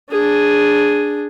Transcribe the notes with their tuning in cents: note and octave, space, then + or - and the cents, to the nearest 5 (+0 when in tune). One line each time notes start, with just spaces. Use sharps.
D4 +0 G#4 +0